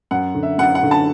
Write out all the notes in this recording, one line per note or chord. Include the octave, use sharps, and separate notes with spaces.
F#2 F#5
D3
E5
F#2 F#5
F#5
D3
A5